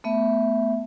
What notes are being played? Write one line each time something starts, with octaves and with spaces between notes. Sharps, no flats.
A3 B3 E5